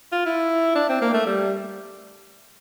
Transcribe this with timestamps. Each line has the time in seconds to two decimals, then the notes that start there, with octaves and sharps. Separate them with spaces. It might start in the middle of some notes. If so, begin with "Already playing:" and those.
0.12 F4
0.26 E4
0.75 D4
0.89 C4
1.01 A#3
1.13 A3
1.26 G3